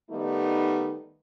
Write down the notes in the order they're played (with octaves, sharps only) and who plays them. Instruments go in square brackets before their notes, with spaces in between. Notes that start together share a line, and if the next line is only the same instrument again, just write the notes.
[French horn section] D#3 G3 A3 B3 D#4